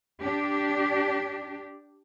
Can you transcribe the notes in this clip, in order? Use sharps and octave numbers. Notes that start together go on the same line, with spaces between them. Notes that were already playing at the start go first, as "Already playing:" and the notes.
D4 G4